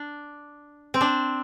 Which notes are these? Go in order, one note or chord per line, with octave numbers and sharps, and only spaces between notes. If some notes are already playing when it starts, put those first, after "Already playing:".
Already playing: D4
C4
D4